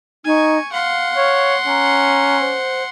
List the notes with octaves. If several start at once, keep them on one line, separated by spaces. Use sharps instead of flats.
D#4 G#5 C#6
F5 F#5 C6
C#5
C#4 A#5
C5